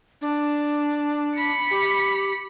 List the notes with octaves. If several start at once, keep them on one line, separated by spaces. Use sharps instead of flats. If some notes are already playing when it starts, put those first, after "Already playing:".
D4
B5 C#7
G4